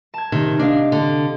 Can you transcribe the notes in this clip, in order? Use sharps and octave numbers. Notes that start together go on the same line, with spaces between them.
A5 G#6
C3 D#3
D4 D#5 F5
D3